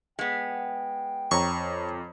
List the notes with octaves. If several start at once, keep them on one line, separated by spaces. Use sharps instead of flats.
G#3 B3 G5
F2 C#5 A#5 C#6